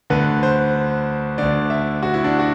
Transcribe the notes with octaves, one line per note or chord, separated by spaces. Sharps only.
D2 D3 B4
C5
D2 D3 D5
E5
F#4
E4
D4
F#4